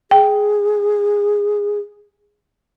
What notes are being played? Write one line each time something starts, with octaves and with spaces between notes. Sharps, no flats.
G#4 G5